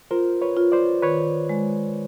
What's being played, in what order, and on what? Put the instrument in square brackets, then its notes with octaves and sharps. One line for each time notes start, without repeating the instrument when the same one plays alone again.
[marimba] F4 [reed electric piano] A#4 C5
[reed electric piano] B4 C#5
[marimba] F4
[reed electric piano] C5 D5
[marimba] D#3 [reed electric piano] B4 C#5
[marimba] G#3